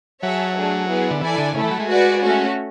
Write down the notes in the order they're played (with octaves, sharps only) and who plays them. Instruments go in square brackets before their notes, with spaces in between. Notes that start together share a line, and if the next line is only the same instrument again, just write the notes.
[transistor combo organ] F#3 [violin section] G#4 C#5 E5 A5
[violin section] A3 D4 G#4
B3 E4 G#4
[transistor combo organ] D3
[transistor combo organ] E3 [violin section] E4 A4 D5 G#5
[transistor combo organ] D3
[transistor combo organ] C#3 [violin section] A3 E4 A4
[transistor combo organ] E3
F#3
G#3
[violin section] F#4 B4 D5
A3 C#4 F#4